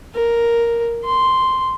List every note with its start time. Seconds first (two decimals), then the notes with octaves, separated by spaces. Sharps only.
0.14 A#4
1.04 C6